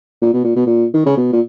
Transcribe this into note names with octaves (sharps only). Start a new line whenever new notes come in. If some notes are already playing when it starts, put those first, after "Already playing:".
A#2
B2
A#2
B2
A#2
D#3
C#3
B2
A#2